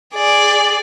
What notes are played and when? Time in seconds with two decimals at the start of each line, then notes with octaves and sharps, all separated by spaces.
0.14 G#4 D5